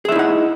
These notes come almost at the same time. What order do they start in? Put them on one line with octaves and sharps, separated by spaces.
G#4 E5 E4 D#4 F#5